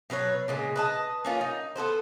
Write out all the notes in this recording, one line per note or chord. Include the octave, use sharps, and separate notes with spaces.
B2 F#3 B4 C#5
A#2 C#3 G#3
B4 D#5 A5
A#3 C#4 F4
D#4
B3 A4 B4 C5